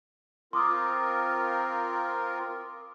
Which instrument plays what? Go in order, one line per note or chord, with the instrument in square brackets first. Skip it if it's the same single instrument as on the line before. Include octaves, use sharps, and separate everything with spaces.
[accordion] C4 F4 A#4 [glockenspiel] C6 D6 D#6